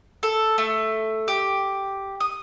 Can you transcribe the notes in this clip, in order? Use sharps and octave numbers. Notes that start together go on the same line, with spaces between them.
A4
A3
G4
D#6